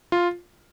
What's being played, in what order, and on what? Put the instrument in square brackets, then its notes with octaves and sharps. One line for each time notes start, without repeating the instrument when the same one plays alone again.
[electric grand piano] F4